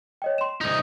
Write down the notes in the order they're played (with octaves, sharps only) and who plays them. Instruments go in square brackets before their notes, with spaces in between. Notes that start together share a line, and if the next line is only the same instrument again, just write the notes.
[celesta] C#5 D#5 G5
C6 E7
[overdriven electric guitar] C2 D#4 [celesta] D#6